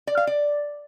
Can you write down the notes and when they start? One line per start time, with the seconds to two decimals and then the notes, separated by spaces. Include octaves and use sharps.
0.07 D5
0.17 F5
0.27 D5